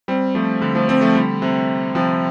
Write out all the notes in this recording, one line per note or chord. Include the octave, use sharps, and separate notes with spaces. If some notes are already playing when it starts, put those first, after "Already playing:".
G3 C4
F3 A3
D3 G3
F3 A3
G3 C4
F3 A3
D3 G3
C3
C3 F3